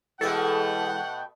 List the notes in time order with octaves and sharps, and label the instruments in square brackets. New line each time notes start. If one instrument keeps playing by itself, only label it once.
[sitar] B2 A3 [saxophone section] E3 G#3 [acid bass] A4 [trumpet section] F#5 G5